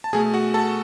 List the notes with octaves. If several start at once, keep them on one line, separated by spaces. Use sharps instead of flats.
A5
B2 A3 G#4 G#5
F#4 F#5
A4 A5